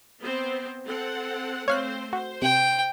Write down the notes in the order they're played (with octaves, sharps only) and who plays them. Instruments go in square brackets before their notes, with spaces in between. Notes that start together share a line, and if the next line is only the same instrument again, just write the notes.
[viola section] B3 C4 C5
C4 A4 F#5
[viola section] A3 C4 C5 [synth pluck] C#5 F5 F#6
[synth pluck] F#4 [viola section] C5
[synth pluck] C3 [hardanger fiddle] G5